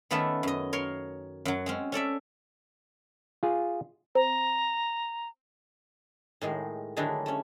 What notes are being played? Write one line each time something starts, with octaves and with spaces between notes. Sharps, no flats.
D#3 A3 B3 C#4 A4 E5
F#2 D#5
A#4 C#5 C6
F#2 F#3
G#3 C4 C#4
C#4 A4 D5 E5
F4 G#4
C4 A#5
A2 D#3 G#3
D3 D#3 F#3 G#3 D4 E4
A3 C#4